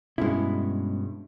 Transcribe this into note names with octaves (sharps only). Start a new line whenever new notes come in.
G2 B2 G#3 C#4 E4